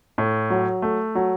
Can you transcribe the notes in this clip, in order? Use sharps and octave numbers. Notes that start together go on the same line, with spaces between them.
A2
F#3
A3
F#3